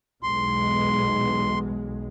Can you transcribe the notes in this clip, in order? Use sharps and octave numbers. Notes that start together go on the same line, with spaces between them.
B1 E2 G#3 C6